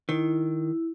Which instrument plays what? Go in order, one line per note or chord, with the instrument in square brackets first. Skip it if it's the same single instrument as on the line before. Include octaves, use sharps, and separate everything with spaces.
[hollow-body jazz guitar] D#3 [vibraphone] E4